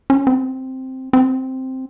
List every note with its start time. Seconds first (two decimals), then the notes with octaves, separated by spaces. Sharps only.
0.10 C#4
0.27 C4
1.13 C4